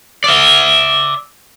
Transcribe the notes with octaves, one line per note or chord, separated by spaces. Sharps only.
D5 E5